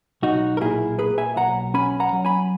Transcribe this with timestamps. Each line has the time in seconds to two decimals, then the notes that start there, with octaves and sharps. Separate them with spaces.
0.23 B1 D#4 F#4
0.57 A#4
0.61 A#2 E4 G#4
0.98 A#3 G#4 B4
1.18 E5 G#5
1.37 B1 F#5 A#5
1.74 C#4 G#5 B5
2.00 F#5 A#5
2.13 F#3
2.25 G#5 B5